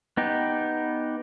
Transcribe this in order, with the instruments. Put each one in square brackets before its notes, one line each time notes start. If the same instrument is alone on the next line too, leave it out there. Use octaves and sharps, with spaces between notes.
[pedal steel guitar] B3 D#4 G4